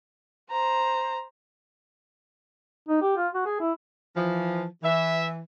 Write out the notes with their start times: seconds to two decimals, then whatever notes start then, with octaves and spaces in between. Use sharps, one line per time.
0.51 C5 A#5
2.88 D#4
3.02 G4
3.17 F4
3.34 F#4
3.46 G#4
3.61 E4
4.17 E3 F3
4.83 E3 E5